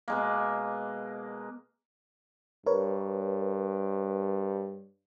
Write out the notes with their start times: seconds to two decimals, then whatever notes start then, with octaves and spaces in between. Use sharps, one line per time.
0.08 B2 G#3 A#3
2.66 G2 A#4 B4 C#5